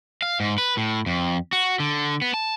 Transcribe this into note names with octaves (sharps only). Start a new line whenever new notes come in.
F5
G#2
B4
A2
F2
F#4
D3
B3
A5